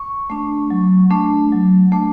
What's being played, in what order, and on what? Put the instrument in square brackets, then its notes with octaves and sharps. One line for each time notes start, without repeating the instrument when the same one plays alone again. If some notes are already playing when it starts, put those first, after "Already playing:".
Already playing: [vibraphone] C#6
A3 D4
F#3
A3 D4
F#3
A3 D4